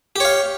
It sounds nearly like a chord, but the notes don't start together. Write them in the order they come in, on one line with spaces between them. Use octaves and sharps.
G4 C#5 F5